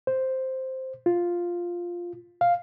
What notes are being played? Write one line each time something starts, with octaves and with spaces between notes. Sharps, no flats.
C5
F4
F5